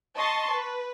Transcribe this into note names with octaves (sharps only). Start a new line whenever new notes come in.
D#5 A5 C6 C#6
B4